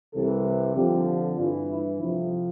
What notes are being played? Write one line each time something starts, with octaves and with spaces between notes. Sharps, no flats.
C2 C3 E3 A4
F2 D3 F3 G4
G2 E3 F4
E4
F2 C3 F3 E4